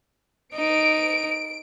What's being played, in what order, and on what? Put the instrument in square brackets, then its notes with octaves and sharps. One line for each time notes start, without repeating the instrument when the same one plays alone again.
[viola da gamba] D#4 [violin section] D7